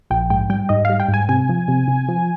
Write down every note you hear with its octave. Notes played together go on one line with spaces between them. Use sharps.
A#1 G5
G#2 G5
G3 G5
G#2 D#5
G3 F5
G5
G#2
G#5
C3 G#5
F3
C3
C3
F3